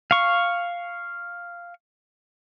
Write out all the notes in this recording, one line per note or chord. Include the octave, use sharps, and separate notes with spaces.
F5 C#6